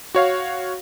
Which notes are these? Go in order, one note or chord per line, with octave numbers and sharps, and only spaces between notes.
F#4 C#5 F5